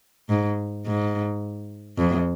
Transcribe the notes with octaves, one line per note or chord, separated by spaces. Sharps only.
G#2
G#2
F2